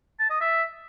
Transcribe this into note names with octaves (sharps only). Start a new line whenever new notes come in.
A5
D#5
E5